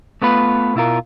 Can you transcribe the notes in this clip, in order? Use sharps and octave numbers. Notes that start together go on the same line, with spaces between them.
A3 B3 F4 B4
B2 E4 F4 A#4